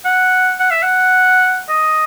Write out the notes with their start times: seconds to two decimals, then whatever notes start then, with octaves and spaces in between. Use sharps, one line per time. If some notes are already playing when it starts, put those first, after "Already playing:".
0.05 F#5
0.60 F#5
0.71 E5
0.82 F#5
1.69 D#5